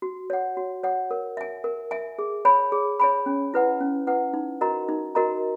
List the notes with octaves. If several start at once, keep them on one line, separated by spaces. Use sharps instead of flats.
F#4
C#5 F#5
F#4
C#5 F#5
A#4
E5 G#5
A#4
E5 G#5
G#4
C#5 G#5 B5
G#4
C#5 G#5 B5
C#4
E4 B4 F#5
C#4
E4 B4 F#5
D#4
F#4 A#4 D#5 A#5
D#4
F#4 A#4 D#5 A#5